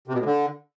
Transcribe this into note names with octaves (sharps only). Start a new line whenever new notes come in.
C3
B2
A2
D3